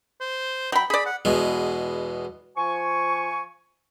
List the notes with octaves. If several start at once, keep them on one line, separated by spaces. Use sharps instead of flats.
C5
F#3 G5 B5
G#4 D5 B5
F#5
E2 B2 G#3
F3 G#5 C#6